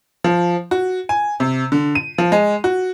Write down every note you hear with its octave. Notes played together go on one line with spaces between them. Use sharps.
F3
F#4
G#5
C3
D3
D#7
F3
G#3
F#4